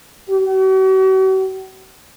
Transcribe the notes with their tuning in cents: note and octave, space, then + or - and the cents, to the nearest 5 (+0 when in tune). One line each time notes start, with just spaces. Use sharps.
F#4 +45